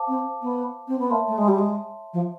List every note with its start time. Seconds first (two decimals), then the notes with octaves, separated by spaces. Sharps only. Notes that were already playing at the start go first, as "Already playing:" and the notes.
Already playing: C5 F5 A5 D6
0.08 C4
0.42 B3
0.88 C4
0.99 B3
1.10 A#3 C#5 E5 A5 C6
1.28 A3
1.38 G#3
1.48 G3
1.58 G#3
2.14 F3